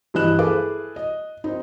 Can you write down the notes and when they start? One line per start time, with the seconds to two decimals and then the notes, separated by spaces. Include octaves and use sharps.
0.14 G2 E3 E4 D#5 F#6 E7
0.39 E4 G#4 A4 B4 F5 D6
0.96 D#5
1.44 C4 D#4